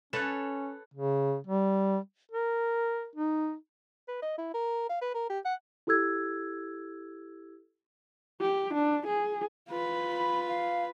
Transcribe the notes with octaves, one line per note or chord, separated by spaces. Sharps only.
C#4 A4 B4 C#5 F#6 A6 E7
C#3
G3
A#4
D#4
B4
D#5
E4
A#4
F5
B4
A#4
G4
F#5
E4 G4 A4 E6 G#6
G4
D4
G#4
F4 B4
B5
F5